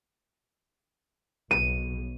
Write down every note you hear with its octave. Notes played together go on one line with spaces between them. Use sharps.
B1 B2 D#7